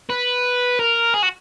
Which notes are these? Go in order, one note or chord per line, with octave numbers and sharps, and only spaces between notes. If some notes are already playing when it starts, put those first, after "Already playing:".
B4
A#4
G#4
F#4